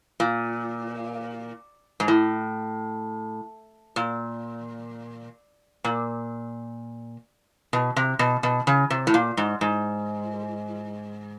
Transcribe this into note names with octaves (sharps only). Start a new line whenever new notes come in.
A#2
G#2
A2
A#2
A#2
B2
C3
B2
B2
C#3
C3
A2
A#2
G#2
G#2